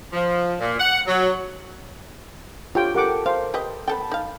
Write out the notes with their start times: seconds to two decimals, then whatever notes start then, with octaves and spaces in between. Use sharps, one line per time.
0.13 F3
0.60 A#2
0.79 F#5
1.07 F#3
2.75 D3 F4 G4 C#5 G5
2.94 G4 A4 A#4 F#5 D6
3.26 C5 F5
3.54 G4 B4 D#5 G5
3.88 B3 A4 G5 A5 B5
4.12 D#4 F5